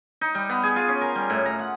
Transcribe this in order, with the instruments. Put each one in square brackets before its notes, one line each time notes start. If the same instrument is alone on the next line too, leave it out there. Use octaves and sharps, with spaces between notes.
[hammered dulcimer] D#4
G3
B3
G#4
F4
C#4
A#4
G3
A2
A#5
F#5